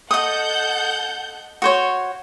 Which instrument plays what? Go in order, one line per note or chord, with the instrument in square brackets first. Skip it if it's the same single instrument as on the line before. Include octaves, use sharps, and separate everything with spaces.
[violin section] A4 F#5 G6 [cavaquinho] D#5 D#6
[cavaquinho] F#4 C5 C#5